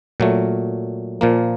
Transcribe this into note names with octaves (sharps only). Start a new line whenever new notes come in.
A#2 F#3 A3
A#2 F3 A#3